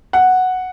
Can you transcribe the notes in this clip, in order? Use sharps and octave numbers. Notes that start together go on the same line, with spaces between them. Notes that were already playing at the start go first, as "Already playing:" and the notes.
F#5